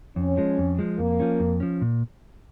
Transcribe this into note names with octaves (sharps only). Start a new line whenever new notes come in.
F2 C#4
F3 G#3
F2
F3 G#3
F2 A#3
F3 C#4
F2
F3 C#4
A#2